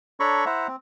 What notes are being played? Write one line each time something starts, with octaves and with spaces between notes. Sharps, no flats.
D4 A4 C#5 A#5 B5 C#6
E4 C5 E5 F#5 A#5
C4